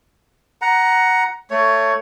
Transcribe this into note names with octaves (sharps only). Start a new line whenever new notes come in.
F#5 A#5
A3 C#5